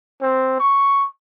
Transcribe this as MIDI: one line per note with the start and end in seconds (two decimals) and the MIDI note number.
0.22 0.58 60
0.60 1.06 85